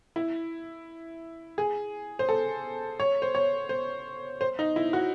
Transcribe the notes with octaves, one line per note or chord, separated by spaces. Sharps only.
E4
G#4
C5
A4
C#5
C5
C#5
C5
C5
D#4
E4
F#4